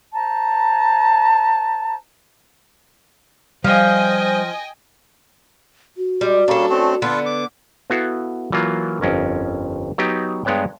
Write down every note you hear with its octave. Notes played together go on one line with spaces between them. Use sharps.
C5 A5 A#5
F3 G3 C5 D#5 G5 G#5
F#4
G3 G#3
G3 A#3 C#4 D4 A4
A3 C4 C#4
D3 B3 F4 A4 B4
D6
B3 E4 F#4 A4 F5
E3 F#3 A#3 F4
G1 F2 C#4 A#4
F#3 B3 D#4 G4
G2 G#3 B3 C#5 G5